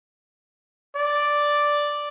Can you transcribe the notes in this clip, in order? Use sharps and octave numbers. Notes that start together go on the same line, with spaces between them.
D5